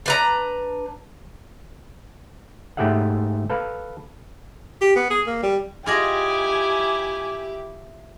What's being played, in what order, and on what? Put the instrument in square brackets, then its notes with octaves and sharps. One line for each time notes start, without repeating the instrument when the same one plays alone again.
[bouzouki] D4 B4 A#5
[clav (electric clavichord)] G#2 A3 G4 G#4 E5 F#5
A4 B4 F5
[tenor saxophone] G4
B3
G#4
A#3
G3
[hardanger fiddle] E4 D6 [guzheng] F4 G#4 D#5 [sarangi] G4 [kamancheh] G#5